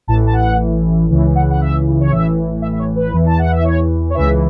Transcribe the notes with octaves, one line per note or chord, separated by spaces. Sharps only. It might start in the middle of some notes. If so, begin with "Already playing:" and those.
A1 A2 E3 A5
A5
F#5
C#2 C#3 E3
F#5
F#5
E5
C#5
A1 A2 E3 E5
E5
E5
C#5
B4
E2 E3
A5
F#5
E5
C#5
C#5
C#2 C#3 E3 E5